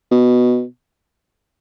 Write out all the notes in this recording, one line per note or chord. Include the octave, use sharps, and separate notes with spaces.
B2